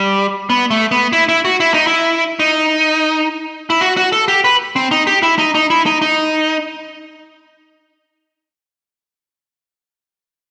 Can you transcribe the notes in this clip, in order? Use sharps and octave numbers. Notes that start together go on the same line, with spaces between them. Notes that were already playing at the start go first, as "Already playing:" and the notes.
Already playing: G3
B3
A3
B3
E4
E4
F#4
E4
D#4
E4
D#4
E4
F#4
F#4
A4
G4
B4
C4
D#4
G4
E4
D#4
D#4
E4
D#4
D#4